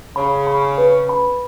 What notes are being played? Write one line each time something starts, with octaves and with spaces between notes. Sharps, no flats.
C#3 B5
B5
B4
B5